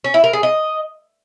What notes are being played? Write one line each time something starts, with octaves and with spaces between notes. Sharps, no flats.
C#4
E4
A#4
G#4
D#5